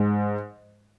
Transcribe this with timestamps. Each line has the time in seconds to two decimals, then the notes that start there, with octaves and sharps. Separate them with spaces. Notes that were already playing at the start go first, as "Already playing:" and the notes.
Already playing: G#2